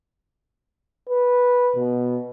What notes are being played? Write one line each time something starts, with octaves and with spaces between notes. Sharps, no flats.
B4
B2